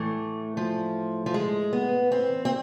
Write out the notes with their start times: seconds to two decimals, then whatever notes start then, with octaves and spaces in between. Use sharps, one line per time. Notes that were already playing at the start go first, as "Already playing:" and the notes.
Already playing: A2 E3 A3
0.57 F3
1.26 F3
1.34 G#3
1.73 B3
2.12 C4
2.45 C4